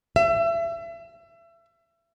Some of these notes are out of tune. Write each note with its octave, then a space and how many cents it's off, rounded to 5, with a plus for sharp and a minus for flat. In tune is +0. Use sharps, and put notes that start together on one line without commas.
E5 +30